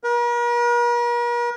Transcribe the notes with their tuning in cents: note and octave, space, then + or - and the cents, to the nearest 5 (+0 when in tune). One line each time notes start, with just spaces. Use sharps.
A#4 +45